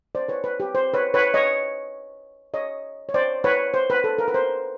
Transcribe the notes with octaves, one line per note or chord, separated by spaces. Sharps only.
C5 D5
B4 C#5
B4
G4
C5
B4 C#5
B4 C#5
C#5 D#5
C#5 D#5
C#5
C5 D5
B4 C#5
C5
B4
A4
A#4
B4
C5